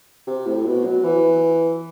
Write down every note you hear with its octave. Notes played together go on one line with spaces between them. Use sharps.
C3
A2
B2
F#3
E3